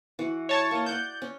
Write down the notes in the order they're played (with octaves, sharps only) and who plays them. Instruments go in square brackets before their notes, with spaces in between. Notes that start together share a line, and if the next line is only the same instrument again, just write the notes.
[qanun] E3 F#4
[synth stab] C#5 A5 C#6
[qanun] A#3 D#5
[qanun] D5 F#5 A5 [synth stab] G6
[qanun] C#4